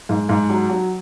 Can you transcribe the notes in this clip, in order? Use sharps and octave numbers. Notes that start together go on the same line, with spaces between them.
G#2
G#2
F#3
F#3